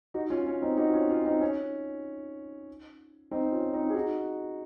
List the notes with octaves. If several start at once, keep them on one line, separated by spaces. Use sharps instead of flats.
D#4 F#4
C#4 F4
C#4
C4 D#4
D#4 F#4
C#4 F4
C#4 F4
C4 D#4
C#4
C4 D#4
C#4 F4
C4 D#4
G#4
D#4 F#4